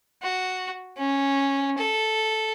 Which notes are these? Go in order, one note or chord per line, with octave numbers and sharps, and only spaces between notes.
F#4
C#4
A4